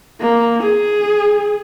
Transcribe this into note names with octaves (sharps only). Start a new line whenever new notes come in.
A#3
G#4